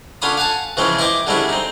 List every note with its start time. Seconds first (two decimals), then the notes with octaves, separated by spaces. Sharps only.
0.22 D3 C#4 F4 B5 D#6
0.37 F5 F#5 G#5 A5
0.77 C#3 E3 F3 G#3 C4 C#4
0.99 E4 C5 D#5 G5 D6
1.27 D3 G3 G#3 C4 C#4 E4
1.49 C4 D#4